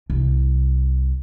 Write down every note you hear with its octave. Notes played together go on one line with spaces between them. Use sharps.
C2